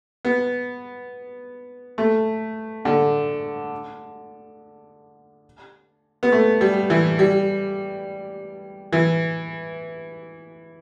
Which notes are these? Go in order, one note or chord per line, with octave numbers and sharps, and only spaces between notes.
B3
A3
D3
B3
A3
G3
E3
G3
E3